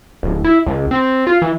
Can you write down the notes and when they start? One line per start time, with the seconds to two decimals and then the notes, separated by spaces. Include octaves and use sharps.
0.23 D1
0.44 E4
0.66 C#2
0.91 C4
1.27 F4
1.42 E3